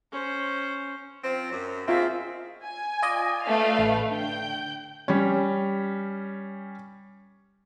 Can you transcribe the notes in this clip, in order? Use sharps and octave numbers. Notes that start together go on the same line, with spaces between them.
C#4 C5
F3 C4
F#2
G#3 C4 F4 E5
G#5
F4 D5 D#5
A3 B4 F5
A1
D3 G5 G6
G3 C#4